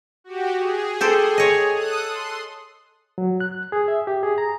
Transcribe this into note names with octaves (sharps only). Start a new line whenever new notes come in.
F#4 G4
G#4
G4 A4 C5
C#5 D#5
A4 D#6 F#6
C6
F#3
F#6
G#4
E5
G4
G#4
A#5